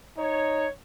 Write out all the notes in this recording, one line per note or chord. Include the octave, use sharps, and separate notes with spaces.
D#4 C#5